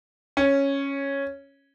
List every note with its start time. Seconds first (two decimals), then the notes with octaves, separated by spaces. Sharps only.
0.37 C#4